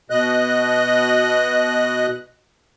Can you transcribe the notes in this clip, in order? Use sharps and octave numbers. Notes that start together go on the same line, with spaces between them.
B2 D#5 F#6